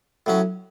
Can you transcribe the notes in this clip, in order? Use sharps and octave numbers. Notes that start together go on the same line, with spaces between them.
A2 F#3 C#4